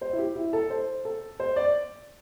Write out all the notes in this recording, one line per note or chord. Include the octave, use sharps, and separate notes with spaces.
C5
E4
G4
E4
A4
C5
A4
C5
D5